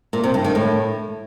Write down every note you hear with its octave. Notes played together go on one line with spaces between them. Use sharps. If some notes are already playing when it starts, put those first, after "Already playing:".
A#2
C3
G2
D#3
A2